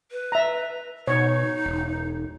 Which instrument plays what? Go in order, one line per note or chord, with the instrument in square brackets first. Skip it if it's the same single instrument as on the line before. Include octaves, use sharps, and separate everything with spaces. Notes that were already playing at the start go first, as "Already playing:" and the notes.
[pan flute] B4
[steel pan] E5 A#5
[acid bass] B2 [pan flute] D#4 [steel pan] C#5
[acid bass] E1